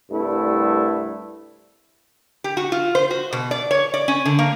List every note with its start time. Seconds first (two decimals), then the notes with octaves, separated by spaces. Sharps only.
0.11 C2 G2 A3 E4
2.44 G4
2.57 F#4
2.72 F4
2.95 C5
3.11 F#4
3.33 B2
3.51 D5
3.71 C#5
3.94 D5
4.08 C#4
4.25 D3
4.39 A#3